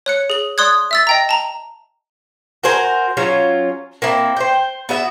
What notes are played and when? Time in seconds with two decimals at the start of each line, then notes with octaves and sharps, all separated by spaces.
0.06 C#5 F#6 C#7
0.30 G#4 F#7
0.58 D5 C6 D#6 F#6 G#6
0.91 E5 E6 A6
1.07 D#5 G5 A#5
1.29 A5 A#5
2.64 F#4 A#4 C5 G#5
3.17 F#3 C#4 F4
4.02 A#3 C4 E4
4.37 C5 G5
4.89 B3 F#4 E5